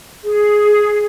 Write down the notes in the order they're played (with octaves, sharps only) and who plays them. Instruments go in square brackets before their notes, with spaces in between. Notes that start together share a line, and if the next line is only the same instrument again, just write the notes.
[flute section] G#4